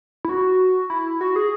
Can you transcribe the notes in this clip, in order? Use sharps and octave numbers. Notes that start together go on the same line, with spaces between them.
E4
F#4
E4
F#4
G#4